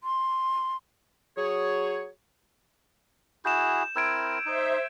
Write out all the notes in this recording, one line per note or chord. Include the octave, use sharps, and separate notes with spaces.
C6
F#3 G#4 C#5
E4 F#4 G#4 G6 E7
C4 E4 A#4 E6 G#6 D7
D#4 C5 E5